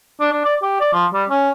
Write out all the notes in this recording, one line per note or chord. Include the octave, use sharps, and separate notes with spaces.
D4
D4
D5
G4
D5
F3
G3
C#4